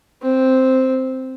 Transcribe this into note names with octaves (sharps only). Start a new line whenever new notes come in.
C4